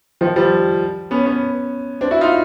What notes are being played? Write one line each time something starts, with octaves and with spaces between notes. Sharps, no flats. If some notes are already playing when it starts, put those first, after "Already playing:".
D#3 F3
F3 G3
B3 C#4
B3 C#4
C4 D4
E4 F#4
D#4 F4